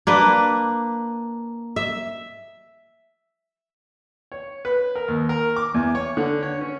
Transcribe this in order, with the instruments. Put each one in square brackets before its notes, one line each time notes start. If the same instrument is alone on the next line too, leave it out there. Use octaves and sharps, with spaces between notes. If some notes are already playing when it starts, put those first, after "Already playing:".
[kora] A#3 D4 B4
E5
[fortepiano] C#5
B4
A#4
D#2
A#4
D6
E2
C#5
D3
C#5
C#4